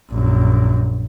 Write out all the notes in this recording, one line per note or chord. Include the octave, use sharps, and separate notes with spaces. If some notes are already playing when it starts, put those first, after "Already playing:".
A#1 F#2